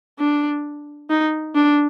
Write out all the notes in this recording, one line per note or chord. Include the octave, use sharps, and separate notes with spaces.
D4
D#4
D4